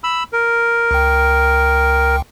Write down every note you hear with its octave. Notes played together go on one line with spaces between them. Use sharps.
B5 E6
A#4
C#2 G5